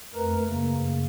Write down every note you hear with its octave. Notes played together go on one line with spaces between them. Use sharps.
F2 A3 A#4 B4 A#5
F#2 C#3 A#3